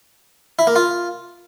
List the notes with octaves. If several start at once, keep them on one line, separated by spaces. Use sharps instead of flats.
E4
A#3
F4